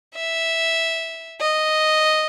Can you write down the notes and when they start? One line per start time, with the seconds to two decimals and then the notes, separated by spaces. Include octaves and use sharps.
0.15 E5
1.41 D#5